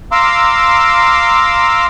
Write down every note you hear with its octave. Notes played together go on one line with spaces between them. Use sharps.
F5 A#5 C6 D6 E6